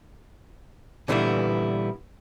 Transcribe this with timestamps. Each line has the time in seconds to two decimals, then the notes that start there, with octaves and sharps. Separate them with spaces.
1.08 A#2 D3 E3 G3 B3 E4